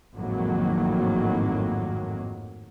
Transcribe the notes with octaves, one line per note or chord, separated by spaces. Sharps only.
G#1 F2 A2 D#3 F#3 A#3